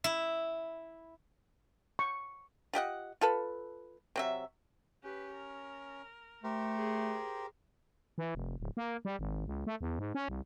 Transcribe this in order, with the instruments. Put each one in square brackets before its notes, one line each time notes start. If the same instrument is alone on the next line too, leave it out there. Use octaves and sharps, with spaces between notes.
[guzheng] E4
[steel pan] C#6
[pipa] F4 G4 D#5 F#5
F4 A4 B4
C3 F#3 E5
[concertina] C#4 [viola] G4 B4
[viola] A#4
[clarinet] A3 [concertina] G4 A#4 C5
[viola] G#4
[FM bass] E3
F1
D1
A#3
G3
G#1
C#2
A3
E2
G#2
C#4
C2